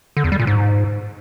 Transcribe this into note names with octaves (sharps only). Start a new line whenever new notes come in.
D3
E2
G3
A#2
G#2